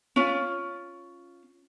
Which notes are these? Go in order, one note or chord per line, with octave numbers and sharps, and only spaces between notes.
C#4 F4